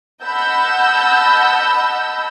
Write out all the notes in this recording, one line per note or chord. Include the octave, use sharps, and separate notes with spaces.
D#5 F#5 A5 B5 E6 G6